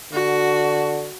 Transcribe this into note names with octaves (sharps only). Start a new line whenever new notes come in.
D3 F#4